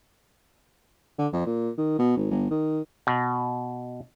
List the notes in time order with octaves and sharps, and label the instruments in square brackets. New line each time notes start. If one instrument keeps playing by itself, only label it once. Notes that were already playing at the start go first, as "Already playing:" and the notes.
[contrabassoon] D3
F2
A#2
D#3
B2
G#1
G1
D#3
[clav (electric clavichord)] B2